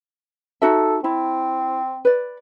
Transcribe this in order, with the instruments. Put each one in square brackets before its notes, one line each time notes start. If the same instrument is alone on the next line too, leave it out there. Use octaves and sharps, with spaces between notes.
[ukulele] D#4 F#4 E5 [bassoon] A4
[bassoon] C4 [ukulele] E4
[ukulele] B4 D5